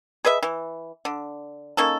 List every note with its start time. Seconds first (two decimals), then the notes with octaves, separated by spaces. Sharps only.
0.25 G#4 B4 D#5 E5
0.43 E3
1.05 D3
1.77 A#3 C#4 D#4 A4